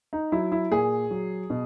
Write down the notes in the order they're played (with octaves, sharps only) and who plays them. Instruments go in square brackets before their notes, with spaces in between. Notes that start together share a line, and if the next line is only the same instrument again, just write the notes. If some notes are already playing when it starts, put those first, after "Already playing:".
[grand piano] D#4
F#3 E4
E4
A#2 G#4
F#3
B2